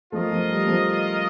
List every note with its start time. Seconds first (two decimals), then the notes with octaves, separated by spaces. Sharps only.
0.12 F3 A3 F4 A#4 D#5
0.31 F3
0.48 G3
0.67 F3 A3